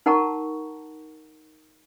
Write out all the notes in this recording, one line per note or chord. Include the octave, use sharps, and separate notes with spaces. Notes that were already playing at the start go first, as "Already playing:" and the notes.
D#4 A#4 F#5 A5 A#5 C#6